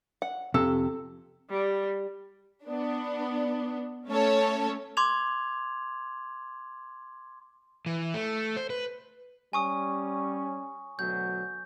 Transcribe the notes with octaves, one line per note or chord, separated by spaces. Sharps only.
F#5
F2 C3 A4
G3
B3 D4
A3 C#4 A4 C#5
C6 D6 G#6 F7
E3
A3
C5
B4
G3 C#4 G#5 C#6 D#6
D2 B2 F#3 G6